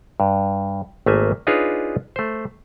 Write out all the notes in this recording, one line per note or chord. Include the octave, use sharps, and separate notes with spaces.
G2
G#1 A3 A#3 E5 G#5
D4 D#4 F4 G#4 B4 C#5
A3 C5